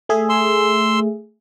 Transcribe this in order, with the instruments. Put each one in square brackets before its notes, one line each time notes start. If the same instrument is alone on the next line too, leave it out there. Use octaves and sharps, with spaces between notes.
[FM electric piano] A3 G#4 E5
[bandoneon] C6 E6